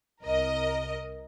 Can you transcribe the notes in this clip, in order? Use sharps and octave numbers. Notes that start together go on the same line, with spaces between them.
C2 A#4 D#5